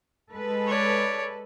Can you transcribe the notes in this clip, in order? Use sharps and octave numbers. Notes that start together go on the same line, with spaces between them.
G#3 A4 B4
C#5 D5